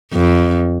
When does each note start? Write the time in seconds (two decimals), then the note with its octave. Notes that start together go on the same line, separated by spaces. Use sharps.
0.13 F2